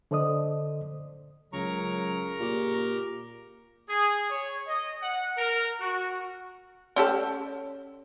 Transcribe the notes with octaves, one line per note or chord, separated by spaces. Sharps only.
D3 A4 C5 D5 D#5 D#6
C#2 C#3 F#3 A#4 A#5 C#6
A#2 G4
G#4
C#5
D#5
F#5
A#4
F#4
C#4 G4 A4